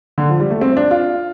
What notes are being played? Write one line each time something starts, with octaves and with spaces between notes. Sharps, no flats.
D3
F3
G3
A3
C4
D4
F4